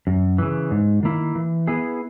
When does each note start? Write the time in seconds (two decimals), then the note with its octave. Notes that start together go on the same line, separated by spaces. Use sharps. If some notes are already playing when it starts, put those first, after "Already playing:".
0.07 F#2
0.38 C#3 E3
0.71 G#2
1.03 D#3 A#3 E4
1.35 E3
1.67 B3 E4 G#4